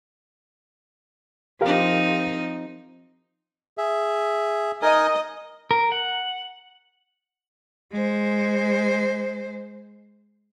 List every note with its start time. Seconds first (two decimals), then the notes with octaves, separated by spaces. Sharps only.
1.61 F3 C4 D#4 G4 A#4 F5
3.78 G#4 E5
4.82 D#4 A#4 D#5 G#5
5.71 A#4
5.92 F#5
7.92 G#3 C5